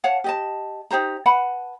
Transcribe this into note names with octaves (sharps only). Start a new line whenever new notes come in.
C#5 F5 F#5 A5
G4 D#5 A5
D#4 G4 C5 A#5
B4 F#5 A5 B5